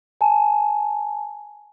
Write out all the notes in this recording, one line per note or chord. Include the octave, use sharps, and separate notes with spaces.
G#5 A5